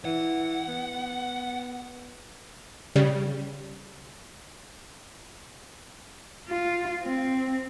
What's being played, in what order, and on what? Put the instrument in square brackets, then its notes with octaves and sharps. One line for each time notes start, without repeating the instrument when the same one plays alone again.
[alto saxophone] E3 [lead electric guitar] F#5
[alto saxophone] B3
[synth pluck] C#3 G3
[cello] F4
C4